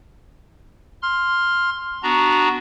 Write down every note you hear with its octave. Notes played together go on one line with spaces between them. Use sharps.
C6 F6
B3 D4 F#4 A#5